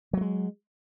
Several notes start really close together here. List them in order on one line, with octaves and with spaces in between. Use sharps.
F#3 A3 G#3